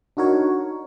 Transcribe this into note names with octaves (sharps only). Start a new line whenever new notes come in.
D4 D#4 F#4 A#4 C#5